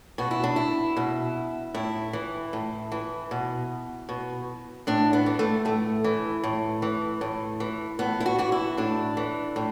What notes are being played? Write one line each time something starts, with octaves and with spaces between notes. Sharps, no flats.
B2 F#4
E4
D4
E4
B2
A2 E4
E3
A2
E3
B2
B2
A2 D4
B3
E3
A3
A2 A3
E3
A2
E3
A2
E3
A2 B3
E4
F#4
E3 F#4
E4
A2 D4
E3
A2